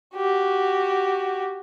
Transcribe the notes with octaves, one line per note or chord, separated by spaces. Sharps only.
F#4 G4